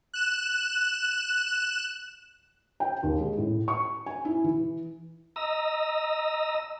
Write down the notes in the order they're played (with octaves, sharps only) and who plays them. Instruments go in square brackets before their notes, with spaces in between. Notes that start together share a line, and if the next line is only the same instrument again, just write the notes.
[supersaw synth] F#6 E7
[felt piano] G5
D#2
G#3
A2
C#6
G#5
E4
E3
[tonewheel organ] D#5 A#5 E6